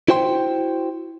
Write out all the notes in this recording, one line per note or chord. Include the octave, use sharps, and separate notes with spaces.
E4 F#4 C5 G5 C6